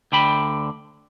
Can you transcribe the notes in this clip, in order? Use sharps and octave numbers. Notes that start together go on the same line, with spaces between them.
D2 D3 G5 B5